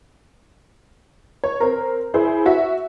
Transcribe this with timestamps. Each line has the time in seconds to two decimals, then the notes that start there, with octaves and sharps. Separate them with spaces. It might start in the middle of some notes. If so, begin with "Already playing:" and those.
1.44 C#5
1.60 C4 A#4
2.14 E4 G#4 C5
2.46 F#4 E5